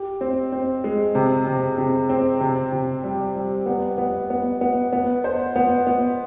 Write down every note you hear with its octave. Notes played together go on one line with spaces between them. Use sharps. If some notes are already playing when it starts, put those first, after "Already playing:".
Already playing: G4
C4
C4
G#3
C3
C3
C3
C4
C3
C3
G3
G3
B3
B3
B3
B3
B3
C5
B3
B3